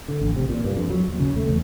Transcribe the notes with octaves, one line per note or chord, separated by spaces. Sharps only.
D3
A1
C3
A#2
G2
F2
F#3
D#2
C#3
A3
E2